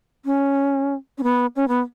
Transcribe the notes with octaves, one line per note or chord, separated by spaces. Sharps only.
C#4
C#4
B3
C#4
B3